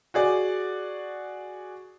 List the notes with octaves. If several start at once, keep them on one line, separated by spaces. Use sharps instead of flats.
F#4 G#4 D5